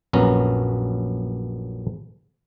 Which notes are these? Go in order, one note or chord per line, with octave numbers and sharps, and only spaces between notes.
A#1 F#2 B3 C#4 A#5